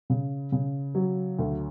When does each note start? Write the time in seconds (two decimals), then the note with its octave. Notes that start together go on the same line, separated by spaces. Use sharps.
0.10 C#3
0.52 C#3
0.95 F#3
1.39 D2